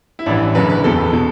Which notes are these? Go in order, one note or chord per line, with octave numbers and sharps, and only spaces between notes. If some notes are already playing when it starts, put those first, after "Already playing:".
E4
A1 G2 E3 D4
F#1 F#2 D3 B4
B4
E1 E2 B2 A4
B2